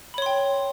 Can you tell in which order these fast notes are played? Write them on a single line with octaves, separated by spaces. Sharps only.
B5 C#5 C6 G5